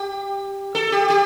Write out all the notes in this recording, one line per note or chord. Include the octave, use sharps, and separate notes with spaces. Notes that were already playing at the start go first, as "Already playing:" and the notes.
Already playing: G4
A4
G4
G4